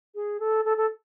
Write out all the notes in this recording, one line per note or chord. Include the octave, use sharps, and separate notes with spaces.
G#4
A4
A4
A4